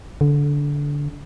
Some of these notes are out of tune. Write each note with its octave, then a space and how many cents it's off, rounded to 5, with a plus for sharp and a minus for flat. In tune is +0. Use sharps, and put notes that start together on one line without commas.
D3 -20